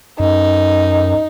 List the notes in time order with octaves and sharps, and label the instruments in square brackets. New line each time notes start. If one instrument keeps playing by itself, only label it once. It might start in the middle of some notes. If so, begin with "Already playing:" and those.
[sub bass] F#2 [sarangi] D#4